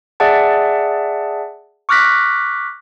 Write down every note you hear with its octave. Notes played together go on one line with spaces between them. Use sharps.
G#4 D5 E5 F#5 A5
C#6 D6 F6 F#6 A#6 B6